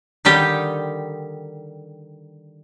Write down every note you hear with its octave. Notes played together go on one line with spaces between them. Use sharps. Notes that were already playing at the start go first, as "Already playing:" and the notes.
D3 D#3 G3 D#4 G4